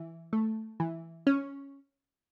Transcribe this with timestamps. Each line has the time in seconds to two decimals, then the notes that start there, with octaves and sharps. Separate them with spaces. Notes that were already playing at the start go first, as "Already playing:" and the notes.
Already playing: E3
0.33 A3
0.80 E3
1.27 C#4